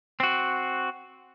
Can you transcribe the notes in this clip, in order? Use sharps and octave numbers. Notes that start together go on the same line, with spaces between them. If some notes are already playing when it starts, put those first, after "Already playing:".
C4 F#4